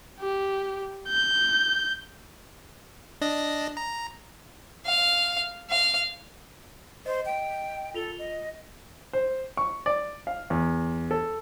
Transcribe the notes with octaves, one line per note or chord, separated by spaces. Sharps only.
G4
G6
D4 D#5 A#6
A#5
F5
F5
C5 D#5
G5
F4 A4 F7 G7
D#5
C5
C#6
D5
F5
E2
A4